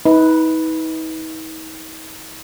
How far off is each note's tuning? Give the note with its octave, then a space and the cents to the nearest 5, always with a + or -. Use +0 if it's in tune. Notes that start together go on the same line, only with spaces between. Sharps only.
D#4 +40 B4 +0